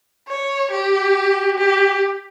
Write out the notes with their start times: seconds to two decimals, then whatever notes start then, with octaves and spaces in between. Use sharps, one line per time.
0.28 C#5
0.72 G4
1.57 G4